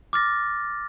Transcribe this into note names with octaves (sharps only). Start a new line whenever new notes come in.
D6 F6 A6 A#6